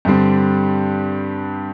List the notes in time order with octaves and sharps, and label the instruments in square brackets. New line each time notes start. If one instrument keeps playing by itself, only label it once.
[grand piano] G2 D3 G3 C4